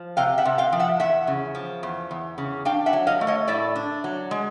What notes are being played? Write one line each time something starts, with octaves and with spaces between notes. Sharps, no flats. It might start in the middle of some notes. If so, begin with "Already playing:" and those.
Already playing: F3
C3 F5 G5
E5 F#5
C3
F5 G5
F3
E5 F#5
E2 E5 F#5
C#3
F3
E2
E2
C#3
D4 F5 G5
E5 F#5
F#3
D#5 F5
A3
C#5 D#5
A2 D5 E5
D4
F#3
G#3